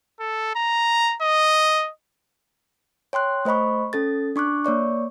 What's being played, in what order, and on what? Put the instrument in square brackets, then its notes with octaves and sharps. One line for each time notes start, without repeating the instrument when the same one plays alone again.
[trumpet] A4
A#5
D#5
[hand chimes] C#5 G5 C6 F#6
A3 C5 D#5 B5 C#6
C#4 A4 A6
D4 C#6 D6 F#6
A#3 C#5 D5 C#6